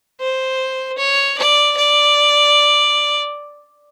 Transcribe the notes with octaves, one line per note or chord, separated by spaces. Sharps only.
C5
C#5
D5
D5